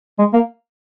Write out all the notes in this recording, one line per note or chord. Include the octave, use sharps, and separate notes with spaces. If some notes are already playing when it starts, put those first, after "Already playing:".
G#3
A#3